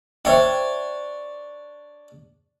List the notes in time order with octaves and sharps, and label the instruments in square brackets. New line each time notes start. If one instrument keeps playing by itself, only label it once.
[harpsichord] D4 C#5 [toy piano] C5 E5 G5